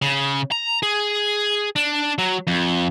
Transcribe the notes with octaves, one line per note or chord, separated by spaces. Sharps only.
C#3
A#5
G#4
D4
F#3
F2